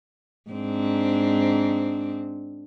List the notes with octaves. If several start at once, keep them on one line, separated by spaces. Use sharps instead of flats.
G#2 C4 D4